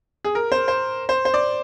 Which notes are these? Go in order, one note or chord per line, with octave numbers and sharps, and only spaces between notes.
G#4
A#4
C5
C5
C5
C5
D5